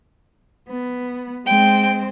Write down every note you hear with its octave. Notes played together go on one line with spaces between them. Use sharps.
B3
G#3 C4 G5